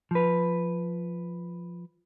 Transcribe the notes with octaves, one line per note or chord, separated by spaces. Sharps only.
F3 B4